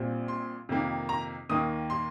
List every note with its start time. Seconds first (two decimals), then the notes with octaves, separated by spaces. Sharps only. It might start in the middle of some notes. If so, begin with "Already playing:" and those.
Already playing: A#1 A#2 G3 C4
0.28 C6
0.69 F2 C3 D#3 A#3
1.09 A#5
1.49 D#2 D#3 A#3 D#6
1.90 C6